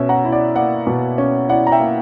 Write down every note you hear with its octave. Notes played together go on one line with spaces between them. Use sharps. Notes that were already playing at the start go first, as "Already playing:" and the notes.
Already playing: B2 C#4 E5
F#5 A#5
E4
D5 F#5
A#3 D5 F#5
B2
C#4
E4 D5 F#5
A#5
E5 G5
A#3